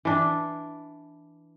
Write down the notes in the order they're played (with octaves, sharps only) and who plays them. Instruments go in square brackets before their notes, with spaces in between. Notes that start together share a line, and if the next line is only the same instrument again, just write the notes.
[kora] E3 D4